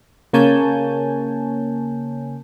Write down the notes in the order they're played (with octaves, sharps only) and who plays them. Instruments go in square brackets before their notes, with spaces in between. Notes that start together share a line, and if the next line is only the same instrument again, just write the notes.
[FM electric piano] C#3 A#3 C#5 G#5 A5 G6